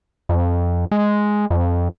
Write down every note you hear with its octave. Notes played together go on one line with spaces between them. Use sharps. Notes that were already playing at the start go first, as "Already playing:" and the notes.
F2
G#3
F2